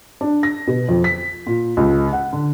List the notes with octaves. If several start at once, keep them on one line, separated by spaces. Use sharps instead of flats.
D4
A#6
B2
F2
B6
A#2
C#2
F#5
D3